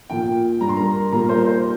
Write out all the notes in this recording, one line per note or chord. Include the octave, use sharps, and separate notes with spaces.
A#2 F3 G5
G2 G3 A#5
C6
A#4 A#5
A#2 G3 A#4 A#5
C5 C6
C5 C6